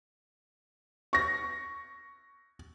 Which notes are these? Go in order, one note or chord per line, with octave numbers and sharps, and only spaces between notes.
C#6 A#6